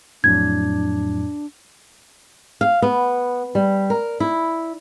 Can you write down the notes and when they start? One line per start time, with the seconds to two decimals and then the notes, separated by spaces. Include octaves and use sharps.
0.24 F2 A2 F#3 D4 G#6
2.61 F5
2.82 B3
3.55 G3
3.90 A#4
4.20 E4